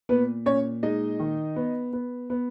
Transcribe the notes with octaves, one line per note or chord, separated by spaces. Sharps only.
A#2 B3 B4
A#2 C#4 C#5
G#3 D#4 D#5
D#3
B3
B3
B3